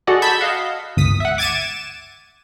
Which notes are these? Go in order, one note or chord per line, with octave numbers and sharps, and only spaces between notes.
F#4 G#4 A4 D5 D#5 F#5
A5 B5 E6 G6 G#6 B6
D#5 F5 F#5
G1 C#2 D#6 B6
E5 F#5
D6 G#6 A6 C#7 D#7 E7